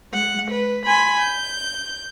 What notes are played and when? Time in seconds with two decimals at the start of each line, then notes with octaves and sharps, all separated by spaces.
0.12 G#3 F#5
0.50 B4
0.85 G#5 B5 C6
1.16 G6